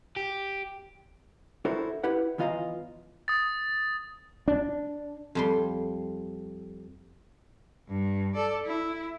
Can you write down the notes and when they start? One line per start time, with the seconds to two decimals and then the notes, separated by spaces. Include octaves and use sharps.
0.16 G4
1.65 D4 E4 F#4 A4 A#4 C5
2.04 E4 G4 B4 F#5
2.38 E2 E3 F4 D#5 F5 A#5
3.28 D#6 A6
4.48 D4
5.35 F2 G3 C6
7.88 G2
8.34 A4 D5
8.65 E4